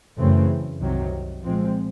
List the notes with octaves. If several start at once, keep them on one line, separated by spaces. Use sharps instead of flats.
F#2 C#3 E3 A3 C4
C2 C3 D#3 F#3
A#2 F3 G#3 C4